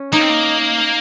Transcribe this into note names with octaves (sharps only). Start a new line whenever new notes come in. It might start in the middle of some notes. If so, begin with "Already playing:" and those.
Already playing: C#4
A#3 D#4
C4
A#3